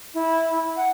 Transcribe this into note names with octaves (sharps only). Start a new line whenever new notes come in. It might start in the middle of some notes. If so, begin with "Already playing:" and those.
E4
F#5